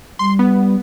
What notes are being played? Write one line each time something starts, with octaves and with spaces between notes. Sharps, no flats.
G3 C6
B3